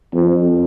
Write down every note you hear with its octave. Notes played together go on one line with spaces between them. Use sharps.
F2